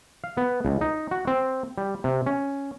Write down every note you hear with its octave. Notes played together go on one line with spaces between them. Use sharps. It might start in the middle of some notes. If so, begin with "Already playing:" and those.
F5
B3
C#2
D#4
F#4
C4
G3
C3
C#4